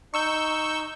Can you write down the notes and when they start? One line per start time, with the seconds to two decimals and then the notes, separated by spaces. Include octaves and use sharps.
0.14 D#4 C#6 E6 G6